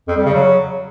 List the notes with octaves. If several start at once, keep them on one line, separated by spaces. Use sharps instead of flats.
F2
G3
C#3
F#3